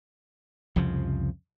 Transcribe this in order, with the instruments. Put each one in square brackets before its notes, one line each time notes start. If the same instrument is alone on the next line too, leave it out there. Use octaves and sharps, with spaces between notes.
[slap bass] C2 F2 C#3 F3